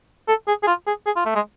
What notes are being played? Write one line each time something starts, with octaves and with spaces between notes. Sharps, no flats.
A4
G#4
G#4
F4
G#4
G#4
F4
A3
G#3